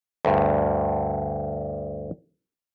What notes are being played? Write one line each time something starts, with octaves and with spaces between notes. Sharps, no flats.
D2 G2